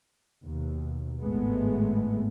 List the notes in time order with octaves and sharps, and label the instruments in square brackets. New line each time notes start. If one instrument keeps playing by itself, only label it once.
[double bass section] D#2 B2
G#1 A2 G#3 A3 B3